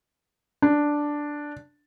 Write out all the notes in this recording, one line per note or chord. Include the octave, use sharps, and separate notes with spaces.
D4